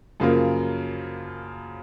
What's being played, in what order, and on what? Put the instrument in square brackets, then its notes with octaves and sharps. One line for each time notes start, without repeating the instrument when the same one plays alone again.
[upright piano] F#2 C#3 F3 A#3